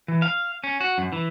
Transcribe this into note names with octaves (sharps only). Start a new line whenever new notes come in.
E3
F5
C#4
F#4
F#2
E3